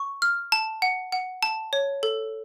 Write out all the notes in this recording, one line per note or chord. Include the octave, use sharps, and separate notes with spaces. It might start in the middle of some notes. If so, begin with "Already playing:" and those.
Already playing: C#6
F6
A5
F#5
F#5
A5
C#5
A4